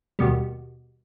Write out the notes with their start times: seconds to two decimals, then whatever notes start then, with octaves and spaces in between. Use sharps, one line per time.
0.19 D#2 B2 G3